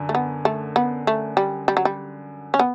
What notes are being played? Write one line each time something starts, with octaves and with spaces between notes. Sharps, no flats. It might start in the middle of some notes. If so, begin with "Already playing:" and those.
Already playing: F#2 D3
A3
B3
A3
B3
A3
G3
G3
F#3
G3
C#4
B3